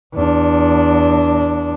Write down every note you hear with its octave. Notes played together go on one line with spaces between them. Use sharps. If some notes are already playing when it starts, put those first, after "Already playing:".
E2 D4